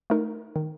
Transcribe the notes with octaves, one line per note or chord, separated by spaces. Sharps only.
A3 D#4 A#4
D#3